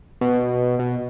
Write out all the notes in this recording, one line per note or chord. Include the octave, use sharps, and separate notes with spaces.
B2
B2